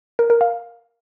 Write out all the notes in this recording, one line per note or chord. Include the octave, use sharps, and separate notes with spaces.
A#4
A#4
F5